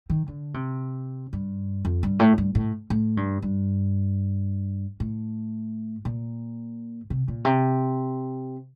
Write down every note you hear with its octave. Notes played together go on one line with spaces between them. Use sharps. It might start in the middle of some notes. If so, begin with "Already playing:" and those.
D#3
D3
C3
G2
F2
G2
A2
G2
A2
A2
G2
G2
A2
A#2
C3
A#2
C3